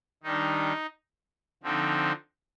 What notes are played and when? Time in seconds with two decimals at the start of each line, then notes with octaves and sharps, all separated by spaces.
0.23 D#3 G3 D4 D#4
1.63 D3 F3 C4 D#4